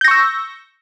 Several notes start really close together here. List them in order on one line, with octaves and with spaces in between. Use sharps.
G6 A#6 C#6 E6